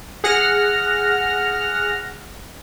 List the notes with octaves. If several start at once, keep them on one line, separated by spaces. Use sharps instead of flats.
G#4 F#5 F6 A#6